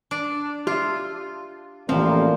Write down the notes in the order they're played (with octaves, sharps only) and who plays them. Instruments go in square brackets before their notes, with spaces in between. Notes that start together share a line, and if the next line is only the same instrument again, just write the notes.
[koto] D4
[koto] F4 [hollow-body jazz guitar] G4 E5
[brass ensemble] A1 [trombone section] A#2 G3 A#3 [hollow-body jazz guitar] E3 C4 [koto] F3